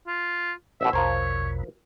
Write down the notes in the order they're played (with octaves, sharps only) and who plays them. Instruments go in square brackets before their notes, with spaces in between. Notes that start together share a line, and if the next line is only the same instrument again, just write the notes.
[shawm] F4
[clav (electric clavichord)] A1 B2 [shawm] E5
[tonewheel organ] A#1 E2 B2 [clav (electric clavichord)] F3 A#4 C5 [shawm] C#5